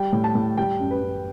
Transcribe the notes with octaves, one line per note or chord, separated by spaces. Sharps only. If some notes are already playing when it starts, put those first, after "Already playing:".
Already playing: G3 G5
A2
A5
A2
G3 G5
F#2
B4
F#2